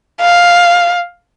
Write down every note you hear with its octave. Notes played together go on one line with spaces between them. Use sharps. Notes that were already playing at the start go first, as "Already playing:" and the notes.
F5